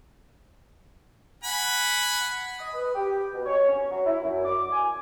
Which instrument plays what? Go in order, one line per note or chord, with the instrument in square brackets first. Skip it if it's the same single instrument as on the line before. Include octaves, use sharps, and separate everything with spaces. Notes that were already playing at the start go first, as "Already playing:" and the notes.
[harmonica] F#5 G#5 B5
[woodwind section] D#6
B4
G4
B2
C#5
C#4
F#3
E4
F#2
D6
G#5